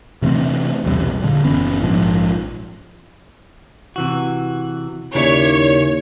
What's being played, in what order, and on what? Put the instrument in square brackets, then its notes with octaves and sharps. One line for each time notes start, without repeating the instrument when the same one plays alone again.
[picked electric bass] C3 E3 A3 C4
B1 E2 C3 G3
A#2 D3
F#1 E3 B3 C#4
A#1 G#2 F3
[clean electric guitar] C3 E3 F#4
[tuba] D#2 [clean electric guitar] C#3 E4 D5 [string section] C#5